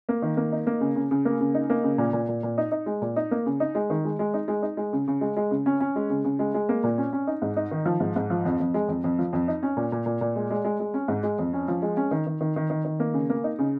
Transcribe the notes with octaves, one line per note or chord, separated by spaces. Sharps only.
A#3
D#3
A#3
D#4
A#3
C#3
C#3
C#3
A#3
C#3
D#4
A#3
C#3
A#2
A#2
A#2
A#2
D#4
D#4
G#3
A#2
D#4
A#3
C#3
D#4
G#3
D#3
G#3
G#3
D#4
G#3
D#4
G#3
C#3
C#3
G#3
G#3
C#3
C#4
C#4
G#3
C#3
C#3
G#3
G#3
A#3
A#2
C#4
C#4
D#4
G#2
D#4
D#3
F3
G#2
G#2
F3
F2
F2
G#3
F2
F2
F3
F2
D#4
C#4
A#2
A#2
A#2
A#2
G#3
G#3
G#3
G#3
C#4
G#2
G#3
F2
C#4
F3
G#3
C#4
D#3
D#3
D#3
D#3
D#3
D#3
A#3
C#3
A#3
D#4
C#3